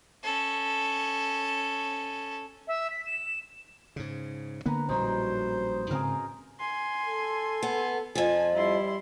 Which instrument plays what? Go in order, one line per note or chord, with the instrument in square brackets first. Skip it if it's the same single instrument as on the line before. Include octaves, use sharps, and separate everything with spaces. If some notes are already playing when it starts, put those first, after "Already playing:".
[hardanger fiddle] C#4 A4
[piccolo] E5
B6
E7
[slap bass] G#2 C#3
[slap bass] D3 A#3 B3 [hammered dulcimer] B4 A#5
[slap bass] A#1 A2 G3 [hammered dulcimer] F#2 D#4 [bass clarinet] C5
[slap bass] G#2 C#3 C4 [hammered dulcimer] G#4 A#4
[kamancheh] G#5 C6
[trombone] A4
[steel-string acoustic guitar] B3
[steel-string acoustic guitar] F2 F3 [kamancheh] G#5
[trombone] G3 [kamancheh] E4 C6